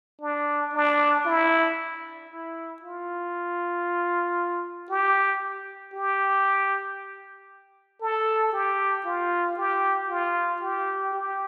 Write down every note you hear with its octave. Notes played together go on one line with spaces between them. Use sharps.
D4
D4
E4
E4
F4
G4
G4
A4
G4
F4
G4
F4
G4
G4